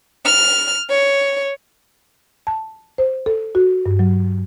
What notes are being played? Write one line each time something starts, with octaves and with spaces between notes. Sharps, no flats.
F6
C#5
A5
C5
A4
F#4
G2
F#3